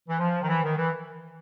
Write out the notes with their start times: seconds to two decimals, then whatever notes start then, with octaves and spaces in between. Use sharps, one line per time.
0.08 E3
0.19 F3
0.42 D#3
0.48 E3
0.63 D#3
0.76 E3